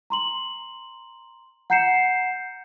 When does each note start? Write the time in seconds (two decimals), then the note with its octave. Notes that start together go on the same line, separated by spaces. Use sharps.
0.10 A#5 C6 F#7
1.70 F#5 A#5 G6 C7 C#7 E7